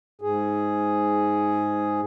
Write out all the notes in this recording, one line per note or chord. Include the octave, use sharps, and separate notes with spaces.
G#2 G#4